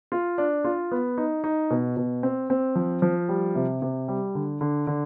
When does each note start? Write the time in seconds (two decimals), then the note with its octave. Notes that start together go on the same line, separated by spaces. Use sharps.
0.12 F4
0.38 D4
0.64 F4
0.91 B3
1.18 D#4
1.44 D#4
1.70 B2
1.97 B2
2.23 C4
2.50 C4
2.75 F3
3.02 F3
3.29 G3
3.55 C3
3.82 C3
4.08 G3
4.35 D3
4.61 D3
4.87 D3